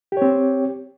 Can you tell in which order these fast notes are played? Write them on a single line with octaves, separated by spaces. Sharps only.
G4 C#5 C4